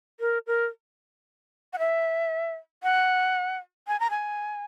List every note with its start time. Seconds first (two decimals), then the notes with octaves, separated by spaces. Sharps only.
0.20 A#4
0.47 A#4
1.73 F#5
1.79 E5
2.83 F#5
3.88 G#5
4.00 A#5
4.10 G#5